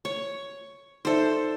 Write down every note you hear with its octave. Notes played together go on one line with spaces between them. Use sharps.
C#5
D#4 A4 C5 D5 E5